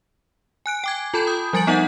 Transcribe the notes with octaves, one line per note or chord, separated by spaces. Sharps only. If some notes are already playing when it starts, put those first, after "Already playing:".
G#5 F#6 D7
G5 D6 G#6
F4 A4 A5 B5 G6
D#6 G6
F3 G3 G#5 A6 D7 F#7
B3 D#4 D#5 F#5 G6